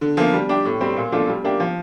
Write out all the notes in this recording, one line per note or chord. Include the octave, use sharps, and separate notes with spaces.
D3
F3 A#3
G3
D4 G4
A2
G3 C4
A#2
F3 A3 D4 F4
G3
A#3 D4 G4
F3